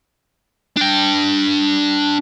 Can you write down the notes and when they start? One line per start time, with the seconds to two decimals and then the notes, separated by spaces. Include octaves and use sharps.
0.77 D4 G5